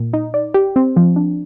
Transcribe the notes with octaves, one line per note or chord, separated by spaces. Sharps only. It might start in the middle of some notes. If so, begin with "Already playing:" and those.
Already playing: A#2
D#4
D5
G4
C4
F3
D4